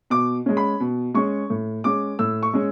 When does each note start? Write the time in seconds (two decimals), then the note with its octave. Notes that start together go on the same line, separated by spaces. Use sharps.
0.10 B2 D6
0.46 G#3 C#4
0.57 B5
0.80 B2
1.14 G#3 C#4 C#6
1.50 A2
1.84 G#3 C#4 D6
2.19 A2 E6
2.43 C#6
2.54 G#3 C#4